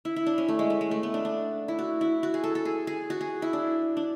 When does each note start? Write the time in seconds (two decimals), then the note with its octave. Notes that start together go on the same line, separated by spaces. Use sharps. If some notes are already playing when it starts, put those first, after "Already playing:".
0.05 E4
0.16 E4
0.26 D4
0.38 C#4
0.48 A3
0.59 G#3
0.70 A3
0.81 G#3
0.91 A3
1.03 B3
1.14 D4
1.25 D4
1.68 E4
1.79 F#4
2.01 E4
2.23 F#4
2.34 G#4
2.44 A4
2.55 A4
2.65 G#4
2.87 G#4
3.10 F#4
3.21 G#4
3.42 E4
3.53 D4
3.97 D4